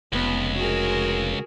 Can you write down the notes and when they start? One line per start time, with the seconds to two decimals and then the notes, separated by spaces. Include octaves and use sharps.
0.12 F1 C#2 B3
0.58 F#4 G#4 A#4